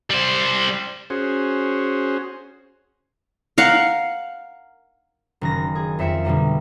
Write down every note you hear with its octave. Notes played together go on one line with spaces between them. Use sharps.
G3 C5
C#4 F#4 G#4 C5
A#4 F5 F#5
F#1 D#3 A#6
G#4
F2 C4 E5 G6 C#7 E7
B2 D3 G3 A#3